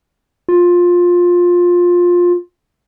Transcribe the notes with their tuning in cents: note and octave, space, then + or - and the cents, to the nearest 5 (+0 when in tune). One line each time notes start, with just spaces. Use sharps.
F4 +15